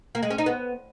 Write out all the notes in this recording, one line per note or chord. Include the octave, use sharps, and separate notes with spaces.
A#3
G#3
C#4
D#4
B3